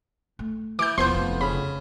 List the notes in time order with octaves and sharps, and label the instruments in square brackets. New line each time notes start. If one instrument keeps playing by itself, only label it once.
[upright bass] A3
[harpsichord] E3 [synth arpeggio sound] D6 G6
[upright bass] E1 [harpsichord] F3 B3 [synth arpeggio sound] C6 G6
[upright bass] F1 E3
[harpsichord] C#3 [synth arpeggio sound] B5